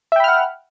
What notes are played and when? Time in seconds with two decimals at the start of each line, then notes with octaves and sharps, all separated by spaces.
0.12 E5
0.16 G5
0.20 B5
0.24 F6
0.28 F#5